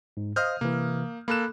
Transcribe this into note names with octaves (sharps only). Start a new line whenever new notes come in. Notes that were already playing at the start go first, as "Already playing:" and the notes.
G#2
C5 D#5 F5 D#6 F6 G6
C3 E3 A#3
A#3 A4 B5 F#6 E7